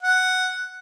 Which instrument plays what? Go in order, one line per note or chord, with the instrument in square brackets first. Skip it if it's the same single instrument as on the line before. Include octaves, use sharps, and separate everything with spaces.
[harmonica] F#5